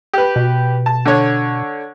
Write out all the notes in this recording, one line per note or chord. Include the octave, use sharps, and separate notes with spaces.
G4 B4
B2
A5
D3 D4 C#5